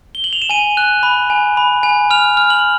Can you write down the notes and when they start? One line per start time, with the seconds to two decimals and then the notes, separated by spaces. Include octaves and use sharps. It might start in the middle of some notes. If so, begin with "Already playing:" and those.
0.15 G7
0.24 F#7
0.33 F7
0.42 E7
0.50 G#5 D#7
0.77 F#6
1.03 B5
1.30 G#5
1.57 B5
1.83 G#5
2.11 F6 F7
2.37 F6
2.50 F#7